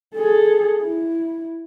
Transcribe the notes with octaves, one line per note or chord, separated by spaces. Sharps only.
G#4 A4
E4